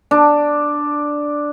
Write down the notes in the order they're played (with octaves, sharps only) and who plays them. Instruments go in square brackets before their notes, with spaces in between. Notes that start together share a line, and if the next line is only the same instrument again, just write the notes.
[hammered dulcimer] D4